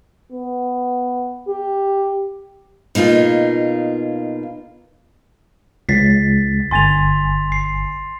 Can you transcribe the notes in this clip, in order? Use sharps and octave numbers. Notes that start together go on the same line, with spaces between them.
B3
G4
B2 A#3 D#4 F4 G#4
C#2 A6 B6 C7
G1 G#5 C6 A6 F7
C7